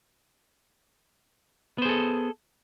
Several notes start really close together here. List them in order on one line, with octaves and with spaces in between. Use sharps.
B3 C5 G#4 A4